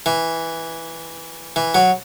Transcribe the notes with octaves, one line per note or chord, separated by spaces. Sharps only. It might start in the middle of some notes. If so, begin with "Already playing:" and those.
E3
E3
F#3